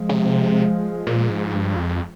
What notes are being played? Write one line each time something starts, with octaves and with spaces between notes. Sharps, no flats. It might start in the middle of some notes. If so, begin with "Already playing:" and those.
Already playing: F3 G#3
C#3
C3
A#2
G#2
G2
F2